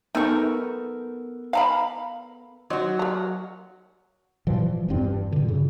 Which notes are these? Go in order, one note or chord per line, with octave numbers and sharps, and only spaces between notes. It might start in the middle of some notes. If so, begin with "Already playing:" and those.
B3 D#4 A4 A#4 C#6
F5 A#5 B5
F#3 D#4 F#4 C5 C#5
A#4 A#5
A#2 E3 F3 G3
E1 E2 G2 C4
G2
A#2 D3
G2 C#3